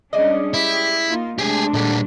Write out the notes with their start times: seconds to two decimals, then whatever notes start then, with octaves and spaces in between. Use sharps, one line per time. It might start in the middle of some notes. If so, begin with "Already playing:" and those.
0.13 G3 G#3 C#4 D4 D5 D#5
0.54 E4 G4
1.09 A#3 D#4 F4
1.38 C3 G#3 A3 D4 G4 G#4 A5
1.74 A#2 G3 A4 D5 F#5